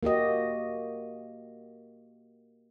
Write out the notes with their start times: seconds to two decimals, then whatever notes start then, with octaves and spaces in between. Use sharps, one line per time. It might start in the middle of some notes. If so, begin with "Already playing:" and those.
0.03 A#3 F#4 G4 D#5